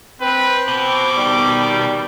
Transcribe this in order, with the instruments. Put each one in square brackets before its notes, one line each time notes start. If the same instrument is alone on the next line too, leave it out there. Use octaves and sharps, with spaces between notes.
[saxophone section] C4 [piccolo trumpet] B4
[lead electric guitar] B2 [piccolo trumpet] D6
[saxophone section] D#3 G3